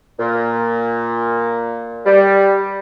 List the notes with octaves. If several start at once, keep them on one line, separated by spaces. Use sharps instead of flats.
A#2
G3